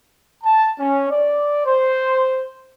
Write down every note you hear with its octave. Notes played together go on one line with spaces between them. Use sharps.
A5
C#4
D5
C5